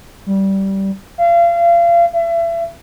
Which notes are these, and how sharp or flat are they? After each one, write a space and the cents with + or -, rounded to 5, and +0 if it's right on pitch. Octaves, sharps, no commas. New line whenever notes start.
G3 -15
F5 -35
E5 +35